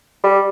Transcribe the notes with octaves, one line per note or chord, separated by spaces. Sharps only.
G3